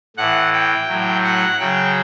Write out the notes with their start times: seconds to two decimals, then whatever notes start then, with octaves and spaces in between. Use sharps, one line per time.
0.17 A2 E3 F#5
0.53 G5
0.88 A2 F#3
1.24 F#5
1.59 C#3 F#3 G5